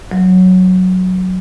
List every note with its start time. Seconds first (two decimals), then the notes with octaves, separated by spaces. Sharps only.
0.11 F#3